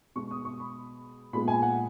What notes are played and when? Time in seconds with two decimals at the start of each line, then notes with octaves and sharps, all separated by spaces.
0.16 B2 G#3 B3 C#6
0.31 D#6
0.45 C#6
0.60 B5
1.33 A#2 G#3 B3 B5
1.48 G#5
1.62 F#5